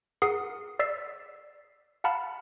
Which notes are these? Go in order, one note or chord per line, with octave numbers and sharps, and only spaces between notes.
G#4 A#4 F#5 D#6 C7
D5 E6 B6 C7
F5 F#5 A5 B5 F6